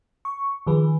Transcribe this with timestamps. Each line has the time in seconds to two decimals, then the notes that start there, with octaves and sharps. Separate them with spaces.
0.25 C#6
0.66 D#3 F3 G#4 B4